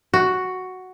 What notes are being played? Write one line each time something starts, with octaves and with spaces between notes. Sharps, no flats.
F#4